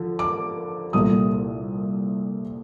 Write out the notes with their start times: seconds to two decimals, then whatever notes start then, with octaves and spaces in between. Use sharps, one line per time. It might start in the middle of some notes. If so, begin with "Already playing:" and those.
Already playing: D3 F3
0.19 D6
0.93 C2 A#2 A3 D#6